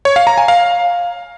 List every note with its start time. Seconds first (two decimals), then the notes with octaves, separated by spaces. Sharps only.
0.05 C#5
0.16 F5
0.27 A#5
0.38 G#5
0.48 F5